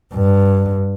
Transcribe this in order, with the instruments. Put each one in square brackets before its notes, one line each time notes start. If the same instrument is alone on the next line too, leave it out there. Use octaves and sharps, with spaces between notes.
[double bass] G2